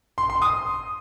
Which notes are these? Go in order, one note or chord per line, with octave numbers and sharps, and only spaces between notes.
C6
C6
D#6